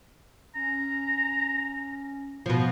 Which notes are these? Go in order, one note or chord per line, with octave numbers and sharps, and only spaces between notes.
C#4 A#5
B2 F3 B3